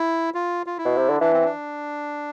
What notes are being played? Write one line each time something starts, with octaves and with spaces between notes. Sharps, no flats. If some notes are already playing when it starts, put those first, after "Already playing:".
Already playing: E4
F4
F4
E4
B2
C3
D3
E3 D4
C4
D4